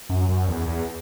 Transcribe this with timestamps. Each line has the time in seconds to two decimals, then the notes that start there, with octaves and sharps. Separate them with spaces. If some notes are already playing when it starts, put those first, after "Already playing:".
0.09 F#2
0.28 F#2
0.48 E2
0.67 E2